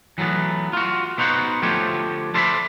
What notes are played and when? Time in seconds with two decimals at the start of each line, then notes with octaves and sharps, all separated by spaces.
0.18 E3 F#3 A3 B3
0.73 F4 F#4
1.18 B3 D#4 F#4 C5 F#5
1.62 D3 F3 A3 G4 C5 C#5
2.34 A4 C5 D5 E5 A5 B5